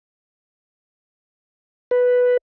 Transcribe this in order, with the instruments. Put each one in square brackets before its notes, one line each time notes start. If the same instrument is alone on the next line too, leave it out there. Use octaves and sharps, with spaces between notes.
[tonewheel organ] B4